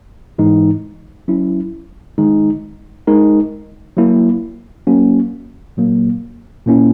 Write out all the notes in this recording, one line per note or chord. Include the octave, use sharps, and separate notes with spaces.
G#2 E3 G#3 D#4
F#3 C#4 E4
D#3 G#3 D#4
G#3 D#4 A#4
F#3 A#3 E4
F#3 A#3 C#4 F#4
A#2 F#3 A#3
A#2 A#3 C#4 E4